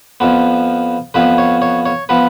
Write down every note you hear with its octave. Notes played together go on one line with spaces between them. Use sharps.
F2 F3 B3
F2 F3 B3 B4
C#5
C#5
C#5
F3 B3 B4